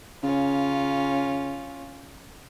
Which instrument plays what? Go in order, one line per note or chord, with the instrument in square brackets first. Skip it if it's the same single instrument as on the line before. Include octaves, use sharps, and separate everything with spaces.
[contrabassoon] C#3 [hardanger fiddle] C#4 F4